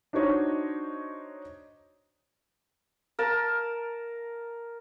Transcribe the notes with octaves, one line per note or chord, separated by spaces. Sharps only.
D4 D#4 F#4 C5 C#5 D#5
A#4 A5